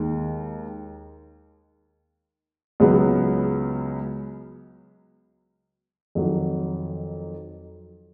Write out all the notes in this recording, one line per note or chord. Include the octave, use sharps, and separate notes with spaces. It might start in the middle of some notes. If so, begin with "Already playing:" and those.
Already playing: D#2 D#3 G#3
C#2 C#3 F#3 B3
F2 D#3 F#3